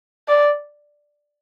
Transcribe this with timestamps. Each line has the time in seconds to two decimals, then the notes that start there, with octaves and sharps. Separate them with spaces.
0.28 D5